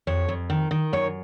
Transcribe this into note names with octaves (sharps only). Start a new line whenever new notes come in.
F2 C#5
F2
D#3
D#3
F#2 C#5